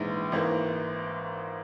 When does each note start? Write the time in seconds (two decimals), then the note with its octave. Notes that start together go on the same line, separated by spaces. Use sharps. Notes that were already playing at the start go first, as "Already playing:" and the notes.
Already playing: A#1 G#2 E3 G#3
0.32 G#1 G#2 E3 A#3